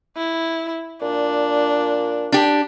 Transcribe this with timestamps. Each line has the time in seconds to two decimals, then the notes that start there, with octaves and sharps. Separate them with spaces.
0.17 E4
1.02 A#2 D4
2.32 D4 G4